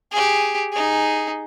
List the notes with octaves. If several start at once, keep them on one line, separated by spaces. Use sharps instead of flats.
G4 G#4
D#4 G#4